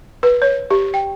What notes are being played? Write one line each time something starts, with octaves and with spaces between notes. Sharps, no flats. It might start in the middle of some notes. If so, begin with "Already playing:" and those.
B4
C#5
G4
G5